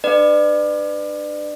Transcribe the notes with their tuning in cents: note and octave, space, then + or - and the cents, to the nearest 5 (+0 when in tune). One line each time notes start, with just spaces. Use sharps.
D4 +25 B4 +20 D5 +30